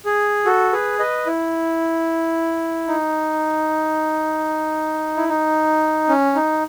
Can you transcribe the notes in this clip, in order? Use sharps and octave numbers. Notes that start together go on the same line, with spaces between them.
G#4
F#4 A4
G#4 B4
B4 D#5
E4
D#4
E4
D#4
C#4
D#4